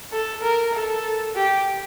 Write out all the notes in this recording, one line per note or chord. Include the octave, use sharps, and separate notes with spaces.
A4
A#4
A4
G4